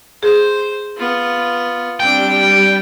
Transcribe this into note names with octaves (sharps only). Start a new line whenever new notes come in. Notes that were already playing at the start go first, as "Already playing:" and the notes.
G#4 C5
B3 F4
G3 C4 D4 G5